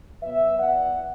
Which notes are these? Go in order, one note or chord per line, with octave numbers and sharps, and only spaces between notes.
B2 F#3 B3 B4 E5
E2 E3 B3 D5 F#5